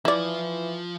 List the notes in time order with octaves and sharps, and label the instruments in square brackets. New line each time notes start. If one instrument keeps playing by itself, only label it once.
[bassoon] E3 [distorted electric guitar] F3 F5 [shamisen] E4 D5